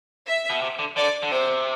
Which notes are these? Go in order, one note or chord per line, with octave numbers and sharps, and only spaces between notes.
E5
B2
C3
D3
D3 D5
D3
C3 C5